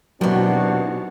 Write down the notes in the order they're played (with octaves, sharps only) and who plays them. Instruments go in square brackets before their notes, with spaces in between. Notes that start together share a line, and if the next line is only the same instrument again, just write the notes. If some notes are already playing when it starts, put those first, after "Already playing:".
[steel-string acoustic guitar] D#2 E3 [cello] B2 [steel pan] F#3 [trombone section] C4 D4 F#4